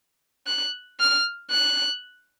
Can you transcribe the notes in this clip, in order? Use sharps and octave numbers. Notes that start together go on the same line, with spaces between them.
F#6
F6
F#6